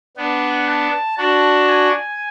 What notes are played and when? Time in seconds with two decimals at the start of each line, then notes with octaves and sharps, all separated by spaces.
0.17 B3 D4 F#5
0.68 A5
1.18 D4 F#4 A5
1.69 G#5